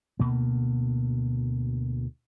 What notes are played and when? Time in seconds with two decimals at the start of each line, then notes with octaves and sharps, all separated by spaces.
0.19 D2 B2 A#3